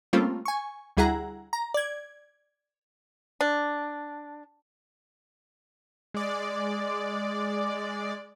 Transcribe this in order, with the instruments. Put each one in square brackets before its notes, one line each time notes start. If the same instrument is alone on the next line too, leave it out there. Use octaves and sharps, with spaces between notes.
[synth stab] G3 A3 A#3 C4 C#4 F4
G#5 C#6
D2 G3 E4 G#4 F#5 A#5
A#5
D5 G#6
[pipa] D4
[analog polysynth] G#3 D5